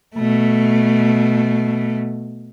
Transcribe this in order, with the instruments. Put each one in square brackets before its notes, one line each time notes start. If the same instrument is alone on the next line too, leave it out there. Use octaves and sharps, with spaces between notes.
[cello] B2 A3